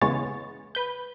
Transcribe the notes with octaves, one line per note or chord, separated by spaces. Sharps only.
E2 C#3 G#3 B3 C#5 A6
B4 G6